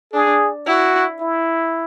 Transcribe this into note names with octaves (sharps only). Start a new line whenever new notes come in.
D4 G#4
E4 F#4
E4